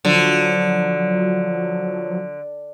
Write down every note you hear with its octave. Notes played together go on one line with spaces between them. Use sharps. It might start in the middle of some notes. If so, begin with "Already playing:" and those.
D3 F3 F#3